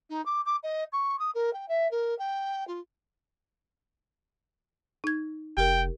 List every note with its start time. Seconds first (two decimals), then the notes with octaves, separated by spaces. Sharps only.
0.10 D#4
0.26 D6
0.46 D6
0.63 D#5
0.92 C#6
1.19 D#6
1.35 A#4
1.53 G5
1.68 E5
1.91 A#4
2.19 G5
2.68 F4
5.04 D#4 G#6
5.57 F1 G4 A#4 G5